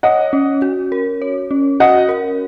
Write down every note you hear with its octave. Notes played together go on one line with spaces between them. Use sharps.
C#5 D#5 F#5
C#4
F#4
A#4
C#5
C#4
F#4 D#5 F#5
A#4